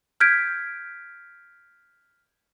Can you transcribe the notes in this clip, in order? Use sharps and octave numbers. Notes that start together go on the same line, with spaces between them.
F6 G6 G#6 B6 D7